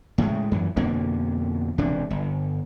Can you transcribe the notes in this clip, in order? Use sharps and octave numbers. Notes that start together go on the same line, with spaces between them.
A2 C#3 G#3
F#2 E3
F2 B2 D3 A#3
E1 D2 C3 D4
G1